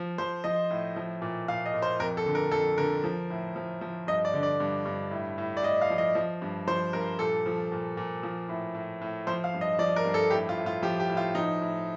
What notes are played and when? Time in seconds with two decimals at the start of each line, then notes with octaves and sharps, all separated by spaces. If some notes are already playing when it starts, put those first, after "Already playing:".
Already playing: F3
0.18 F3 C5
0.44 F3 D#5
0.70 A2
0.96 F3
1.22 A#2
1.48 A#2 F5
1.66 D#5
1.74 A#2
1.82 C5
1.99 F2 A#4
2.17 A4
2.26 D3
2.35 A#4
2.51 F2 A4
2.78 D3 A#4
3.04 F3
3.30 A2
3.56 F3
3.81 F3
4.07 G2 D#5
4.25 D5
4.34 D3
4.43 D5
4.60 G2
4.85 G2
5.11 A2
5.38 A2
5.57 D5
5.63 A2 D#5
5.81 F5
5.90 F3
5.98 D#5
6.15 F3
6.42 G2
6.67 F3 C5
6.93 G2 A#4
7.19 A#2 A4
7.46 F3
7.72 A#2
7.97 A#2
8.23 F3
8.49 A2
8.75 A2
9.01 A2
9.27 F3 C5
9.44 F5
9.54 G2
9.61 D#5
9.79 F3 D5
9.96 A#4
10.05 G2
10.14 A4
10.30 A2 G4
10.49 F4
10.58 A2
10.66 F4
10.83 F3 G4
11.00 G4
11.10 A2
11.17 F4
11.35 F3 D#4
11.61 A2